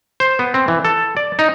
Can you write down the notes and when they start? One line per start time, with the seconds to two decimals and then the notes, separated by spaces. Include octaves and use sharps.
0.20 C5
0.39 B3
0.54 C4
0.68 E3
0.85 A4
1.17 D5
1.39 D#4